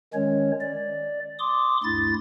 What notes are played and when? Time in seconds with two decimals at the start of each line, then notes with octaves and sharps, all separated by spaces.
0.14 D#3 G#3 C#4 C#5
0.61 D5
1.39 C6 D6 D#6
1.84 D2 G2 E4 A6